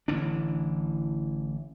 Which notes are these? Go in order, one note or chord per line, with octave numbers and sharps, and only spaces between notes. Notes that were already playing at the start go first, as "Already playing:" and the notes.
A1 D3 E3 D4